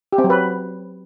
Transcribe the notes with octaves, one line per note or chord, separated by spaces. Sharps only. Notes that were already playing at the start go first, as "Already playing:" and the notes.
G4
C4
F#3
B4